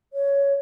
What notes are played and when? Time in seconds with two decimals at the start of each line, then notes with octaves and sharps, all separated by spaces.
0.13 C#5